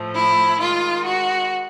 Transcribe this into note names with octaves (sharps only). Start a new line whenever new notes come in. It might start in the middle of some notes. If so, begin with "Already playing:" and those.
Already playing: A2 F3 A3
E4
D#3 G#3 F4
F#4